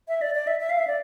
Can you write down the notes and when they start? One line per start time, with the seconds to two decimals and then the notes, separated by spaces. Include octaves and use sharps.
0.08 E5
0.22 D5
0.35 D5
0.47 E5
0.60 E5
0.70 F5
0.79 E5
0.87 D5